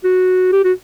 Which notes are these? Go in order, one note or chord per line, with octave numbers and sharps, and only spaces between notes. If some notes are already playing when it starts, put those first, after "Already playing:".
F#4
G4
F#4